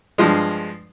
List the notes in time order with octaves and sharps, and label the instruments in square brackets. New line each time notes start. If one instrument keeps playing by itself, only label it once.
[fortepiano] G2 F3 G#3